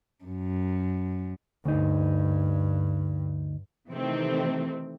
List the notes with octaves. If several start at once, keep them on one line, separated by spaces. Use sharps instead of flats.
F#2
D2 G2 D#4
C3 D#3 E3 A3 C4